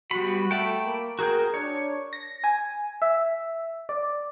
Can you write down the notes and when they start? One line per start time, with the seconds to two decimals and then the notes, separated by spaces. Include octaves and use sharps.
0.11 G3 B3 F#4 B5
0.51 A3 G5 A5 B5
0.85 A#3
1.19 F#4 G#4 A#4 G5
1.54 D4 C#5
2.13 A#6
2.44 G#5
3.02 E5
3.89 D5